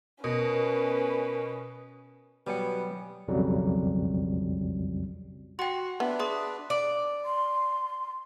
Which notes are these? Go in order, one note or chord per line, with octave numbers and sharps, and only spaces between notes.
B2 C#4 A#4 B4
B2 F#3 G3 B3 G#5 C#7
B1 F2 C#3 F#3 G3
F#4 G5 C6
B3 D4 B4 E5
G#4 C6 D#6
D5
C6